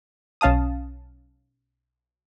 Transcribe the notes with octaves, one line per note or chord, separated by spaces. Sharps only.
B1 C#4 F5 A5 D#6